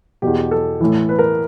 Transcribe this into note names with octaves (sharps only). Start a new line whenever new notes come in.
E2 B2 G4
A4
A2 E3
B4
A#4